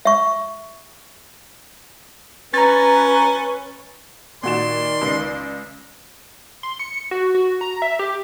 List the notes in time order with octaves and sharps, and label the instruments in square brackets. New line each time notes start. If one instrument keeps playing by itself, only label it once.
[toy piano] E5 C#6
[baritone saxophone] C#4 [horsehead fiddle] B4 [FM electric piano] A#5 A6
[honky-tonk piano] A#2 F#4 E7 [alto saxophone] D#3 [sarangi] D5 [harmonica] C6
[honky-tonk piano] C#2 C7
[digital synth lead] C6
C#7
F#4
F#4
A#5
E5
G4